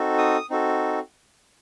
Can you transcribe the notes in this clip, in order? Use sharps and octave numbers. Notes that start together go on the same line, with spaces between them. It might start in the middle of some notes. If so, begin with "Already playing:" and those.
Already playing: C4 D#4 F#4 A4
D#6
C4 D#4 F#4 A4